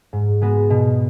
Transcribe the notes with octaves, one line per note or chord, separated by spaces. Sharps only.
G#2
G#3 B3 F#4
B2